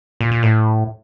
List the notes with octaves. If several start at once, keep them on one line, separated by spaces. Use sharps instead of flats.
A#2
A#2
A2